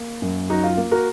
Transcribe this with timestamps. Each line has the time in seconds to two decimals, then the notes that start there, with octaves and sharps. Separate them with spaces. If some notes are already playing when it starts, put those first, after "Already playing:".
Already playing: A#3
0.22 F#2
0.50 F#3 D#4 F#4
0.64 F4
0.77 A#3
0.91 F#4 A#4